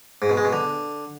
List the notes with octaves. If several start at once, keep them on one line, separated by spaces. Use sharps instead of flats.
G#2
B2
G#3
B2
D3